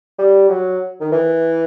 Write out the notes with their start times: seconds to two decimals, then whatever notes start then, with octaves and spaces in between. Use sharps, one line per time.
0.19 G3
0.49 F#3
1.01 D#3
1.12 E3